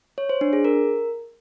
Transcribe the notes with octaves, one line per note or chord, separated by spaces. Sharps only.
C#5
C5
D4
G#4
A#4